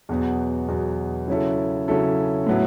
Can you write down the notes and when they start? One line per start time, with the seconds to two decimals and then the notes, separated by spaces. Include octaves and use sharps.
0.09 E2 B2 F#3 B3
0.68 E2 B2 F#3 B3
1.28 C#3 F#3 C#4 E4 A4
1.88 C#3 F#3 C#4 E4 A4
2.46 A2 F#3 B3 E4